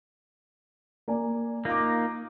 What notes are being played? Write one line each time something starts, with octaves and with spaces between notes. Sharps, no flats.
A#3 D5 G#5
A#3 D#4 F4 F5 D6